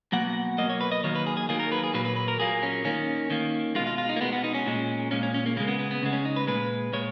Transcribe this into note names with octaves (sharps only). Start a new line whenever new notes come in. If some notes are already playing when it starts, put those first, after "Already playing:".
B2 F#3 A#3 F#5
B2 F#3 A#3 D#5
C#5
B4
D#5
D#3 F#3 A#3 C#5
B4
G#4
G#4
D#3 F#3 A#3 G#4
A#4
B4
G#4
A#2 F#3 A#3 B4
B4
B4
A#4
A#2 F#3 A#3 G#4
C#4
D#3 A#3 C#4
D#3 A#3
B2 G#3 F4
F4
F4
D#4
A#3
B2 G#3 B3
B3
D#4
C#4
A#2 G#3
A#2 G#3 C#4
C#4
C#4
A#3
C#3 G#3 A#3
B3
B3
B3
C#3 G#3
C#4
D#4
B4
A#2 G#3 B4
A#2 G#3 C#5